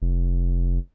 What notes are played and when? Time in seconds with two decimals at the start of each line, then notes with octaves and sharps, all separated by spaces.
0.02 F1